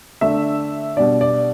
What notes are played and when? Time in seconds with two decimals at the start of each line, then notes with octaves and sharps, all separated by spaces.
0.21 D3 A3 D4 E5
0.97 B2 G3 B3 D4 D5
1.21 D5